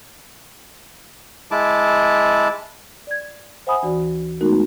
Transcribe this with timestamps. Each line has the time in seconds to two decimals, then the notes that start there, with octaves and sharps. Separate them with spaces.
1.51 G#3 E4 A5 D6
3.07 D5 G#6
3.67 C5 E5 F#5 G#5 B5 D#6
3.83 D2 E3 F#4 D5
4.40 G#3 A3 B3 D#4 F#4 A#4